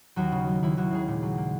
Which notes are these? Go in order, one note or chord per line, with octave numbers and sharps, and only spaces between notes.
D#2 F#3 F#4
C#3
F#3
D#2 E4
D#2 F#3 F#4
C#3 G#3 G#4
A#2
F#3
A#3